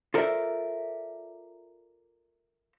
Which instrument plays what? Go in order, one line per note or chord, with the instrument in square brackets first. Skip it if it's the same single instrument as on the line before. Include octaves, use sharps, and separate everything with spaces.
[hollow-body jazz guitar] F4 A4 A#4 C5 D5 E5